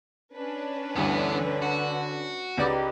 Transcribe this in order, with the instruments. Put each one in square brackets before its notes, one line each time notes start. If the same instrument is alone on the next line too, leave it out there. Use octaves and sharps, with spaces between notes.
[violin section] C#4 D4 B4
[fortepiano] D2 G2 [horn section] D3 [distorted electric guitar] E3 B3
[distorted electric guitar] F#4
[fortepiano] C#2 D5 [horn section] D#4 G4 B4 [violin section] A#4